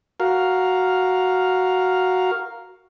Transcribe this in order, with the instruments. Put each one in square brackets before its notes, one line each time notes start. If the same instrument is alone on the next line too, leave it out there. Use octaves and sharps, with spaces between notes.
[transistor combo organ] F#4 A#4 F5